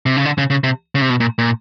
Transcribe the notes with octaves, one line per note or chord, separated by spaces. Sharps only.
C3
C#3
D3
C#3
C#3
C3
C#3
C3
B2
A#2
A#2